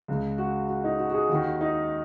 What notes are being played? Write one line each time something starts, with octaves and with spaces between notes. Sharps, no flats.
C#2 C#3
F#4
F#4
D#4
F#4
F#4
G#4
D#2 D#3 F#4
D#4